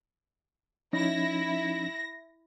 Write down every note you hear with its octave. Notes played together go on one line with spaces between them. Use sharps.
F3 C#4 D#4 E4 A#6